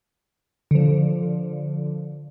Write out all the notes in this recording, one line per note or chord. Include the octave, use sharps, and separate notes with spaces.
D3 F3